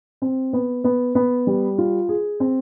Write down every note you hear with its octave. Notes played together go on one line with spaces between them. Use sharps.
C4
B3
B3
B3
G3
F4
G#4
C4